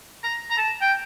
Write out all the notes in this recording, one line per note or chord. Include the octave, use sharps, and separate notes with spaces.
A#5
A#5
A5
G5